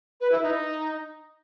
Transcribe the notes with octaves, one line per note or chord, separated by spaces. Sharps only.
B4
E4
D#4